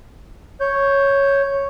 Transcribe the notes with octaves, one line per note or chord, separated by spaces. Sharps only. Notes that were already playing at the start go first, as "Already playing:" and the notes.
C#5 G6